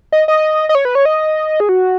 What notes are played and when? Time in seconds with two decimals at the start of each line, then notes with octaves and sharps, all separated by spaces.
0.12 D#5
0.28 D#5
0.69 D#5
0.75 C#5
0.85 B4
0.95 C#5
1.05 D#5
1.60 G#4
1.69 F#4